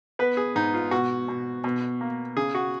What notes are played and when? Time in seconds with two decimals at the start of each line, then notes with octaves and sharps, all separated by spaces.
0.19 B3 B4
0.37 G#4
0.55 G#2 D#4
0.74 F4
0.91 B2 F#4
1.28 B2
1.64 B2
2.01 A#3
2.37 C#3 G#4
2.55 F#4